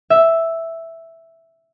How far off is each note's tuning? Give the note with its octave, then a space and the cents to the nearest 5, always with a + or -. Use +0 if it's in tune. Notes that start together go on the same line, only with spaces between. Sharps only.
E5 +0